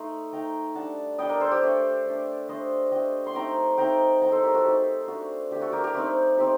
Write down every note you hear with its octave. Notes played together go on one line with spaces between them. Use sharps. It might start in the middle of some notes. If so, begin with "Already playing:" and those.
Already playing: A3 D#4 C6
A3 D#4 G5 A#5
G3 D4 F#5 A5
G3 D4 D#5 G5
A#4 D5
A4 C5
G4
A3 D4
A3 D4
A3 D4 C5 D#5
A3 D4 D#5 G5
C6
A3 C4 D#4 G5 A#5
A3 C4 D#4 G5 A#5
A3 C4 D#4 G5 A#5
A4 C5
G4 A#4
F#4 A4
A3 C4 D#4 G4
A3 D4 F#4
A3 D4 G4
F#4 A4
G4 A#4
G4 A#4
A3 C4 D#4 G4
A3 C4 D#4 G4